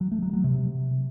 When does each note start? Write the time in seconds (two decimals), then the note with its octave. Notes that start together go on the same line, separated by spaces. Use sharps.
0.01 F#3
0.11 A3
0.22 F#3
0.33 F#3
0.44 C3